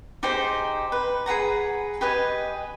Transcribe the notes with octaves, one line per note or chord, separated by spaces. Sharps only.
D#4 G4 G#4 C5
B4
G#4 B4 F#5 A#5
G4 B4 D#5 G#5